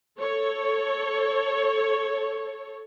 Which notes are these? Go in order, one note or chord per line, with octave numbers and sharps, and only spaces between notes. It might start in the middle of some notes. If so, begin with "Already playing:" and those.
A4 C#5